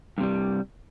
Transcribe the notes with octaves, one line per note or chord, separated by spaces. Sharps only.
G2 C3 G3